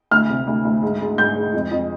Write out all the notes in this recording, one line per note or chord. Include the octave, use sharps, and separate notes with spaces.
D2 F6
C3
D2
D2
G#2
G#3
G#2 G6
G#3
F2
F2